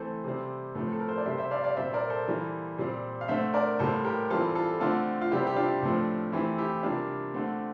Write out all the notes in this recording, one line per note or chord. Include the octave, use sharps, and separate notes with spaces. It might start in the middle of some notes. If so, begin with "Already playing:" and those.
Already playing: E3 A3 C4 A4 C5
C3 G3 C4
A2 F3 A3 C4
A4
A#4
C5
D5
C3 G3 C4 C5 E5
C5 E5
D5 F5
D5 F5
A#2 G3 C4 C5 E5
A#4 D5
A4 C5
E3 G3 A#3
A#2 G3 C4
F5
D3 A3 C4 C5 E5
A#4 D5
A2 G3 A#3 A4 C5
G4 A#4
E3 G3 C4 F4 A4
F4 A4
D3 A3 C4 F4 A4
F4
C3 G3 C4 E4 G4
G4
D4 F4
A2 F3 A3 C4
E3 A3 C4 E4 G4
E4 G4
C3 G3 A#3 D4 F4
D3 A3 C4